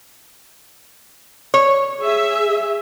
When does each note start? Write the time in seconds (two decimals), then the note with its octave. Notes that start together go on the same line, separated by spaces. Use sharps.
1.54 C#5
2.04 G#4 E5